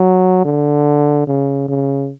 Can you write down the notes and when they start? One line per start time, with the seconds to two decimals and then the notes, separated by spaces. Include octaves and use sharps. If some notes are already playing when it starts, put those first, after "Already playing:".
Already playing: F#3
0.45 D3
1.27 C#3
1.68 C#3